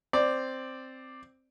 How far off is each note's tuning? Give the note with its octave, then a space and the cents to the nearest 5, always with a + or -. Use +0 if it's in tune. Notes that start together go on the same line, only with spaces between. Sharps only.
C4 +0 D5 +5